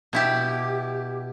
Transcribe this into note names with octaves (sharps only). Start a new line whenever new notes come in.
B2 E4 G4